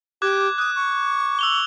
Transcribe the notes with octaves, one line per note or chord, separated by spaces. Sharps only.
G4 D6 F#6 G#6
D#6 F#6
C#6
E6 F7 G7